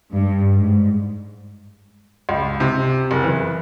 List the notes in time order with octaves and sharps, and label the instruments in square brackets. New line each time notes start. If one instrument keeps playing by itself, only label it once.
[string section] G2
G#2
[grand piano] C#2
C3
F#1
E3